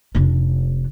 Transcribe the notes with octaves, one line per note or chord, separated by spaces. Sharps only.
F1 D4